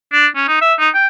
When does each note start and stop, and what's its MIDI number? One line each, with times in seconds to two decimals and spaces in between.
0.12 0.27 62
0.36 0.45 61
0.48 0.57 63
0.61 0.74 76
0.79 0.89 63
0.94 1.07 79